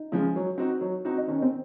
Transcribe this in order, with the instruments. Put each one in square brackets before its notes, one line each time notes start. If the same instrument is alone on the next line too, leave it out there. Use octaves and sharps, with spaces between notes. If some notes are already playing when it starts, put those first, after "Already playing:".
Already playing: [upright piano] D#4
[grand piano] C#3 F3 G#3
F#3
C4 D#4 F#4
F#3
C4 D#4 F#4
[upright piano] D#4
[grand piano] D#3 [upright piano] C#4
[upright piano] C4